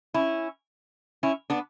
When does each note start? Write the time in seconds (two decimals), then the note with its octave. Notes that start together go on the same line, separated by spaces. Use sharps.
0.14 C#4 E4
1.23 C#4 E4
1.50 B3 D4